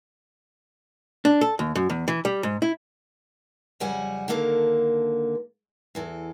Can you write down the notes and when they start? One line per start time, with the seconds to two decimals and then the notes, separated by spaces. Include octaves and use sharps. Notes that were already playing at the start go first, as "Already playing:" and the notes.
1.25 D4
1.41 A4
1.59 D#2
1.75 F#2
1.90 E2
2.08 E3
2.25 G3
2.43 G#2
2.62 E4
3.80 F2 C#3 F#3 G3 F#5 G#5
4.28 D3 D#3 A#3 A4 A#4
5.95 E2 E3 A4